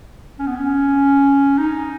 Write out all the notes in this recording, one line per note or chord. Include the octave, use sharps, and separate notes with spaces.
C#4
B3
C#4
D#4